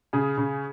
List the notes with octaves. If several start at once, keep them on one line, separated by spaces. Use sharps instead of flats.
C#3 G#4
C#3